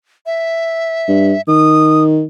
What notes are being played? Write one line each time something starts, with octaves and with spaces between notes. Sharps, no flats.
E5
G2
D#3 D#6